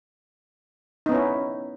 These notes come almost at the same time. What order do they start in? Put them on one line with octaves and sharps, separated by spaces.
D#4 B3 C#4 E4